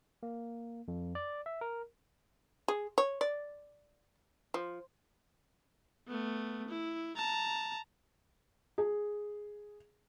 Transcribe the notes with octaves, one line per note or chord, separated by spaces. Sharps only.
A#3
F2
D5
E5
A#4
G#4
C#5
D5
F3
A3 B3
E4
A5 A#5
G#4